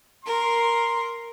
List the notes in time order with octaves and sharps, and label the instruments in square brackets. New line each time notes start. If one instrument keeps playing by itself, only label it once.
[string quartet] A#4 [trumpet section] C6